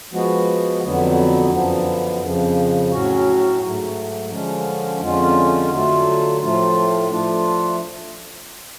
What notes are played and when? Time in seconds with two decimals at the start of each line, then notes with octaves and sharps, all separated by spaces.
0.12 F3 G#3 B3 F#4
0.83 F2 D3 F#3 B3
1.52 F#2 D3 F3 B3
2.21 F2 C#3 F3
2.91 A2 F#3 C#4 F#4
3.61 G#2 F#3 A3
4.31 D3 F3 G#3 C#4
5.01 F2 D3 G#3 C#4 F4
5.71 D3 F#3 A3 F4
6.41 A2 F3 A3 F4
7.10 F3 A3 D4 F4